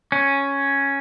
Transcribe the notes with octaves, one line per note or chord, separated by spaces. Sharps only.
C#4